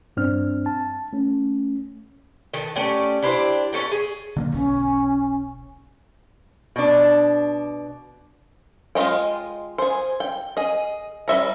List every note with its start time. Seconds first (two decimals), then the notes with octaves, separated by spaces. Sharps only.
0.17 G2 C4 D4 F6
0.66 A5
1.13 A3 C#4
2.54 D#3 A4 B4
2.75 A3 C#4 G4 D5
3.23 D4 E4 G4 C5
3.73 A3 C#4 A4 A#4
3.92 G#4
4.37 D3 A3 A#3
4.53 E1 B1 C#4
6.76 B2 D4
8.95 G#3 F4 C#5 D#5 G5
9.78 G#4 C5
10.20 G5
10.57 G#4 D#5
11.28 G3 D#5 E5 A#5